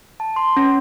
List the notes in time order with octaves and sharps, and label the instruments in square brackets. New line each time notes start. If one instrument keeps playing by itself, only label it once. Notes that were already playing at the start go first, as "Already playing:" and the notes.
[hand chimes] A5
C6
C#4